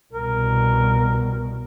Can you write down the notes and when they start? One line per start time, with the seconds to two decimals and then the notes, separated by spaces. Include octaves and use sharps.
0.13 C2 B2 A#4